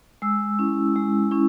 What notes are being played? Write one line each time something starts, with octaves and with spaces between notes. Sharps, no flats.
G#3 E6
C#4 E4
G#3
C#4 E4